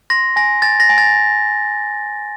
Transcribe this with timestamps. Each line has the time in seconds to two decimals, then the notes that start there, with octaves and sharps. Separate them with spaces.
0.10 C6 A#6
0.36 G#5 A#6
0.62 G#5 A6
0.80 A#6
0.90 G#5
0.98 A6